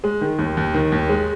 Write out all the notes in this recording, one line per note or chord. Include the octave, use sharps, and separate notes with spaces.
G#3
D#3
D#2
D#2
D#3
D#2
G#3